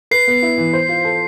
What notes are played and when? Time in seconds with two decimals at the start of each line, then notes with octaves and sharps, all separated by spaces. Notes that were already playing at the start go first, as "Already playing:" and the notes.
0.11 B4 C7
0.28 B3
0.43 E4
0.58 E3
0.73 C5
0.89 F4
1.05 A4